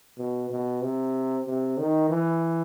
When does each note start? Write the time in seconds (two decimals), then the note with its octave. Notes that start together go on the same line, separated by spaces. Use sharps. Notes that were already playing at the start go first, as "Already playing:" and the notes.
0.18 B2
0.50 B2
0.82 C3
1.46 C3
1.78 D#3
2.09 E3